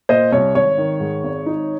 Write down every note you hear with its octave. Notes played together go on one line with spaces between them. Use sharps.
A#2 C5 D#5
C2 C#5
G#1 C#5
D#3
G#2
G#1
D#4